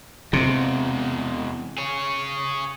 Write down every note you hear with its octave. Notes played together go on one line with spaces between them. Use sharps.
E2 C3 G#3
G#4 C#5